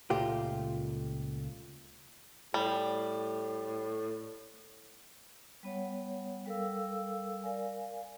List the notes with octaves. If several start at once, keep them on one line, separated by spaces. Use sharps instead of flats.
C#2 A#2 A3 F4 G4
A2 G3
G3 B3 C#5 F#5
G3 A4 A#4 F5 E6
A#4 D5 F5 G#5